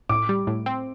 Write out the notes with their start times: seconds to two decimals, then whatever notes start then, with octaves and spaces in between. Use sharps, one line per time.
0.09 A2 D6
0.29 G3
0.47 A2
0.66 C4